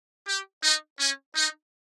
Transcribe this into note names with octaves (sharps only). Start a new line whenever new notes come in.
G4
D#4
C#4
D#4